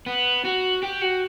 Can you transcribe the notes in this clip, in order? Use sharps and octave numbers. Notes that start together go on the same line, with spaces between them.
B3
F#4
G4
F#4